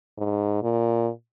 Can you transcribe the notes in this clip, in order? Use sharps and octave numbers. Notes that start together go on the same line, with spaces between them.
G#2
A#2